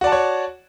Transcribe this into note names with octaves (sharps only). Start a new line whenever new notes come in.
F#4 C#5 D5 F#5 A5